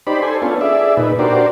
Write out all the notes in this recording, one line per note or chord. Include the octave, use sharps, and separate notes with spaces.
D#4 G4 C5 D5 B5
A4 C5 G#5
B3 C#4 D4 F4 A4
G#4 D5 E5
A#2 D#4 B4
D4 F#4 G4 A#4 C5 D5